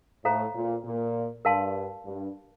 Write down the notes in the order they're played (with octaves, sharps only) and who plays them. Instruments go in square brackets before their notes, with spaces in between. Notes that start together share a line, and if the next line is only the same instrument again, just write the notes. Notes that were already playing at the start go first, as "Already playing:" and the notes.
[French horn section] A2 [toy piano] A4 C5 F5 A#5
[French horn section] A#2
A#2
[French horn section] G2 [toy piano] A#4 F5 A5 C6
[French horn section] G2